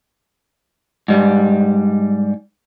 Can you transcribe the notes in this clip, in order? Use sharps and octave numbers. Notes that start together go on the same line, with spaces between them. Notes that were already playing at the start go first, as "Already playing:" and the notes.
G#2 G3